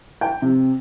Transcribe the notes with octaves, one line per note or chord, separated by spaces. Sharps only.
G5
C3